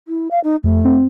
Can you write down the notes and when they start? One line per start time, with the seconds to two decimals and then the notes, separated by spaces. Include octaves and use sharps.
0.08 E4
0.31 F5
0.44 D#4
0.64 F2 A3
0.85 C4